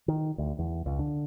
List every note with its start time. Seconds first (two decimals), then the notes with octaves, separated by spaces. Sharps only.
0.08 D#3
0.38 D2
0.59 E2
0.86 C#2
0.99 D3